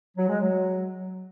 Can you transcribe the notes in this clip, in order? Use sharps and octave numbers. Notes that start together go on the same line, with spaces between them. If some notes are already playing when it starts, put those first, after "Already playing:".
F#3
G#3
F#3